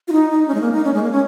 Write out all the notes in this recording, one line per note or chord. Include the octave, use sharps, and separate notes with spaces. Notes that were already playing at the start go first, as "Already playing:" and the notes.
F4
D#4
D#4
C#4
G#3
A#3
D#4
C#4
G#3
A#3
C#4